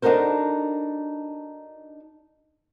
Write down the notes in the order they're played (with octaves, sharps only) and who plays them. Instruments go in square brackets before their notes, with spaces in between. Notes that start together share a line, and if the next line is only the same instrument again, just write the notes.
[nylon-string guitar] D4 D#4 F#4 A4 A#4 C5